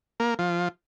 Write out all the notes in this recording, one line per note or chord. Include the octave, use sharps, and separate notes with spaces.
A#3
F3